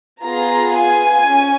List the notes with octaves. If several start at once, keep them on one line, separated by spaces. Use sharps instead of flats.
B3 F4 G#4 A#5
G#5
C#4